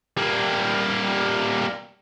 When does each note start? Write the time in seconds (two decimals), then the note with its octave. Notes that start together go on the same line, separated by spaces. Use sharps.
0.17 G3 A#3